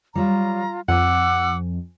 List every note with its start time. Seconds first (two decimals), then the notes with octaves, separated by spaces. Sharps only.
0.15 F#3 G3 F4 A#5
0.89 F2 F#5 G#5 D6 E6